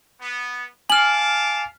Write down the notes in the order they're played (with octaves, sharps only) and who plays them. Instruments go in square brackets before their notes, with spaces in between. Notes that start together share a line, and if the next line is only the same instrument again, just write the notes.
[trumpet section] B3
[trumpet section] F5 A5 D6 [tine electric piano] G#5 [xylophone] F6 F#7